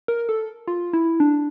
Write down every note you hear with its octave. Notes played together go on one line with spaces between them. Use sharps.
A#4
A4
F4
E4
D4